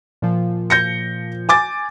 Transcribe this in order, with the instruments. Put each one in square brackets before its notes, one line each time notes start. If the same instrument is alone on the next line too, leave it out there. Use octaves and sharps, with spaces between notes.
[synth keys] A#2 F3
[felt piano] G6 A#6 C#7
G#5 D6 A6